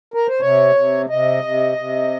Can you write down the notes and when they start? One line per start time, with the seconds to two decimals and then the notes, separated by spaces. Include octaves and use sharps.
0.14 A#4
0.28 C5
0.41 C3 C#5
0.75 C3
1.09 C3 D#5
1.44 C3
1.77 C3